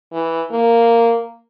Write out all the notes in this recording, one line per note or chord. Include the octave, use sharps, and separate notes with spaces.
E3
A#3